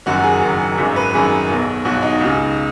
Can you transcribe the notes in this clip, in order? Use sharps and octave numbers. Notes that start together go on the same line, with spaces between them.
F#1 F#2 D#3 F#4
G#4
F#1 F#2 D#3
G#1 F#2 D#3 G#4
B4
G#1 F#2 D#3 G#4
B1 B2
B1 B2 F#4
D#4
C#2 C#3